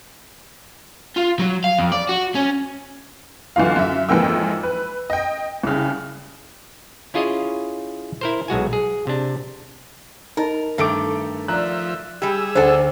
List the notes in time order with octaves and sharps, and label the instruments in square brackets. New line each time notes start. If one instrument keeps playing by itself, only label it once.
[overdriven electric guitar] F4
F#3
F5
F2
D5
F#4
C#4
[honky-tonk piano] B1 D3 E3 F4 F5
F#2 E5
F2 G#2 E3 A#3 G5 E6
B4
D#5 G5
C2 C#3
[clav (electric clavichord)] C#4 E4 F4 G#4 C#5 D#5
E4 A#4 C5
B1 G#3 F#4 G#5
G#4
C3 D4
[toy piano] D#4 D#5 [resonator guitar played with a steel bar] A#4
[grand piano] G2 A4 D7 [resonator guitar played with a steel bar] D#3 A3 [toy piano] E5 D6
[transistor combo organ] F3 E5 [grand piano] D5 F#6 [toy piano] A#5
[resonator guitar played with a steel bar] G3 G4 [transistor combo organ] G#4 E6
[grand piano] D2 [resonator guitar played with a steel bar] D4 A4 [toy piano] C5 F#5